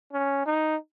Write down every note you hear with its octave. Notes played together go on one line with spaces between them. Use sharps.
C#4
D#4